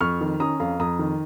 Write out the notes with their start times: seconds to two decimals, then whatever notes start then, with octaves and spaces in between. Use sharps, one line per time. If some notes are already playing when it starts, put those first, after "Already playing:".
0.01 F2 C#6 F6
0.21 D#3
0.40 C#4 A#5 D#6
0.60 F2 F5 A#5
0.79 F2 A#5 D#6
0.99 D#3